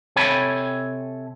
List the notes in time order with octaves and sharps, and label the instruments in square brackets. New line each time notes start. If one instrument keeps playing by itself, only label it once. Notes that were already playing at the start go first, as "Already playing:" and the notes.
[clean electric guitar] C3 A4 C#5 G5 G#5 B5